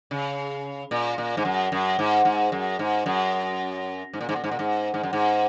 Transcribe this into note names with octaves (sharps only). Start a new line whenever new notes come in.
C#3
A#2
A#2
G#2
F#2
F#2
G#2
G#2
F#2
G#2
F#2
G#2
A#2
G#2
A#2
G#2
A#2
G#2
G#2
F#2
G#2